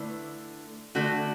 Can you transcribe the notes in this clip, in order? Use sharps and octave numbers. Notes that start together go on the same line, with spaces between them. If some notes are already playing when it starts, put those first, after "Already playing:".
Already playing: D3 A3 E4 B4
D3 A3 F#4